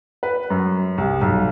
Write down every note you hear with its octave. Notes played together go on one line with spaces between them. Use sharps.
B4
F#2
C2
B1